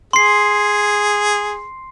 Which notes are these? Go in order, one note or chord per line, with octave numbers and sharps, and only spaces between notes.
G#4 C6 C7